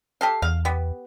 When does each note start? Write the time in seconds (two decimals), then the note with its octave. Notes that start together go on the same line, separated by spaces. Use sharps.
0.21 G4 A4 F5
0.42 E2 F5
0.65 B3 G4